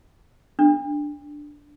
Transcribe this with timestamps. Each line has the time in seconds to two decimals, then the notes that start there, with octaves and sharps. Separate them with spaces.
0.59 D4